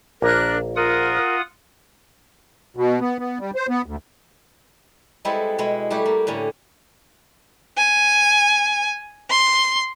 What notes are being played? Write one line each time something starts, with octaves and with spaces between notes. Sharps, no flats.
A#1 A#3 D4 A#4 F#6
F4 A#4 F#5 D#6
B2
B3
B3
G3
C5
B3
D2
G3 G#3 B3 C4 E4 A4
B2 G#3 E4
G3 A3 E4 F#4 G4
A#3
A2 D3 C#4
G#5
C6